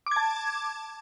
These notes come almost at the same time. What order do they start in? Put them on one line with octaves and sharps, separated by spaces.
D6 G#6 A5